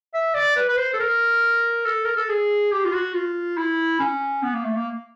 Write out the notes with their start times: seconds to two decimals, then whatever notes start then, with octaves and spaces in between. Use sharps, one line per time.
0.14 E5
0.35 D5
0.56 B4
0.69 B4
0.77 C5
0.94 A4
1.00 A#4
1.86 A4
2.05 A#4
2.17 A4
2.29 G#4
2.72 G4
2.85 F4
2.93 F#4
3.14 F4
3.57 E4
4.00 C#4
4.43 B3
4.54 A#3
4.65 A3
4.76 A#3